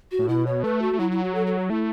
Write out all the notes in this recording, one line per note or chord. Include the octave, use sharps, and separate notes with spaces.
F#4
A2
B2 E4
C#5
A3 B4
F#4
A3
F#3 E4
E4
F#4
A4
A4
F#4
A3 E4